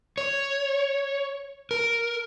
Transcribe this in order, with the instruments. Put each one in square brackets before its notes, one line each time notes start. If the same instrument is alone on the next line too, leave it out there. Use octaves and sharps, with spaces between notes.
[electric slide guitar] C#5
A#4